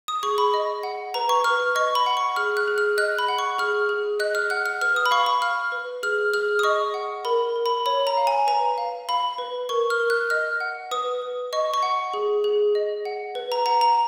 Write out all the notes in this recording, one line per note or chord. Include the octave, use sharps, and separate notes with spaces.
D#6
G#4 C#6
B5
D#5
F#5
B4 A#5
C#6
B4 F6
D#5 C#6
B5
F#5
C#6
G#4 F6
F#6
G#4
F6
D#5 F#6
B5
F#5
C#6
G#4 F6
G#4
D#5 F#6
F6
F#5 F#6
F6
B4 F6
D#6
B5
F5 C#6
B5
F5 F6
B4
G#4 F6
G#4 F6
D#6
D#5 C#6
F#5
A#4 B5
A#4
B5
C#5 B5
A#5
F5
G#5
B4 A#5
F5
F5 B5
B4
A#4 C#6
F6
A#4
F#6
D#5 F6
F#5
B4 D#6
B4
D#5 C#6
C#6
F#5
G#4
G#4
D#5
F#5
B4
A#5
F#5 A#5
A#5